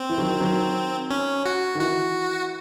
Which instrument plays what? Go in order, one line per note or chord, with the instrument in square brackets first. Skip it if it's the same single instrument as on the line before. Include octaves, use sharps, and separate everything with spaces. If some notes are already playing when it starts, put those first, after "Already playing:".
Already playing: [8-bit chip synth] C4
[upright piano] E3
D#3 F#3
D#3 F#3
[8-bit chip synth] C#4
F#4
[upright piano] D#3
[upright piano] E3 [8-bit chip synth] F#4